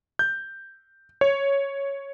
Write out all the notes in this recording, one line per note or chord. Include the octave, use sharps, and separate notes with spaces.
G6
C#5